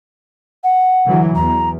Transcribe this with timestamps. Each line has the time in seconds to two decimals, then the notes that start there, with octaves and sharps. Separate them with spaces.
0.63 F#5
1.06 D3 E3 F#3
1.35 E2 A#5